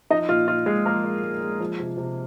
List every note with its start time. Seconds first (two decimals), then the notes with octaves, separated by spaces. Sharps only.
0.10 F3 D#4 D#5
0.29 A#2 F4
0.48 A#2 F4
0.66 A#2 G#3 G#4
0.85 F3 A#3 A#4
1.04 G#3
1.23 G#3
1.41 G#3
1.60 F3
1.79 C3
1.97 C3